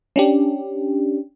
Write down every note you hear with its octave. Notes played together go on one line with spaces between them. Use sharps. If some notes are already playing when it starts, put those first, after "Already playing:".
C#4 D4 G4